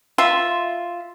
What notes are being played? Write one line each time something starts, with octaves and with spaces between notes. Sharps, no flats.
F4 E5 C6